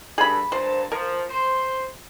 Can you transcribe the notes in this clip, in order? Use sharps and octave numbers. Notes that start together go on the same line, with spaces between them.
G2 G#4 A4 B5
G2 A#2 C5 A5
F3 A#4
C5 C6